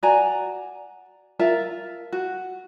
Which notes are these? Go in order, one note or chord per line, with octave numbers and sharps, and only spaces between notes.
F#4 D5 G#5 A#5
F4 A#4 E5 A5
F#4